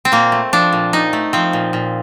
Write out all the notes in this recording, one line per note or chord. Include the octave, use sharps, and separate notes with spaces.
C4
A#2 A#3
A3
F3 D4
A#2
A#2 D#4
A3
F3 C4
A#2
A#2